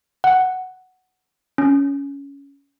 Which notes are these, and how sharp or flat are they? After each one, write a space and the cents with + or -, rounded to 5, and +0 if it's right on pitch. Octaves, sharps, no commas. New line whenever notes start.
F#5 +5
C#4 +15